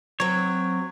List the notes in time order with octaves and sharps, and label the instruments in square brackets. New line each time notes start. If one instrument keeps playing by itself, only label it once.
[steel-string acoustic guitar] F#3 C4 [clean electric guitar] C#5